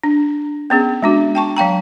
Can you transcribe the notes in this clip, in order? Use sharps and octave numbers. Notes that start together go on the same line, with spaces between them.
D4
B3 C#4 G#4
G#3 D4 F#4
G5 A5 C#6
F#3 F5 G5 A#5